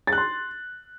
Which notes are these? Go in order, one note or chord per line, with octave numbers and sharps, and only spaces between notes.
A6
F#6
C6